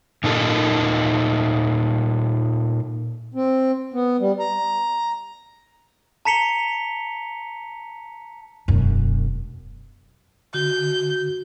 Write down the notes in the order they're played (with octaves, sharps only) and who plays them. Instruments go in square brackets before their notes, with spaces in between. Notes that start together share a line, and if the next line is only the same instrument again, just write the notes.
[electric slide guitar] A#2 D#4 A4 A#4
[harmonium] C4
B3
G3
A#5
[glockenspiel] A5 A#5 B6 C#7 F7 G7
[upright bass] E1 F#2
[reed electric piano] D3 [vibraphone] F#4 [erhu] G6